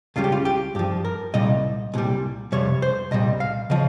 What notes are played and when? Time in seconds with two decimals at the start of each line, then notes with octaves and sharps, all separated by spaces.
0.16 C#2 C#3 G3 F4
0.24 G4
0.32 F4
0.45 G4
0.75 G2 F3 G4
1.05 A#4
1.34 C2 A#2 G3 D#5
1.94 C2 A#2 G3
2.52 F2 C3 G3 C#5
2.82 C5
3.11 C2 A#2 G3 D#5
3.40 F5
3.70 C#3 F3 D#5